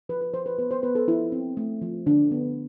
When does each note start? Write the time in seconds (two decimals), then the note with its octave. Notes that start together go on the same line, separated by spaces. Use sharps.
0.09 F3 B4
0.21 B4
0.33 F3 C5
0.46 B4
0.59 B3 B4
0.71 C5
0.83 B3 B4
0.95 A4
1.08 F3 E4
1.32 C4
1.57 A3
1.82 F3
2.06 D3 D4
2.31 B3